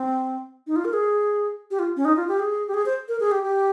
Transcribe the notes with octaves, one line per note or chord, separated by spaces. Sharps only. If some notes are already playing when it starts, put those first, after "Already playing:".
Already playing: C4
D#4
F4
A#4
G#4
G4
F4
C#4
D#4
F4
G4
G#4
G4
G#4
C5
A#4
G#4
G4
G4